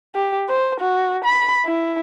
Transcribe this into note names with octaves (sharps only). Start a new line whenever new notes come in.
G4
C5
F#4
B5
E4